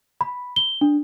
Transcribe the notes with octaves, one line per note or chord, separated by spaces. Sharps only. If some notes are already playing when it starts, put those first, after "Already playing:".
B5
G7
D4